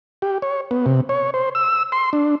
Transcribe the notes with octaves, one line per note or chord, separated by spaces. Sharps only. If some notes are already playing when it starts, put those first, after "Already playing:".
G4
C#5
B3
C3
C#5
C5
E6
C6
D4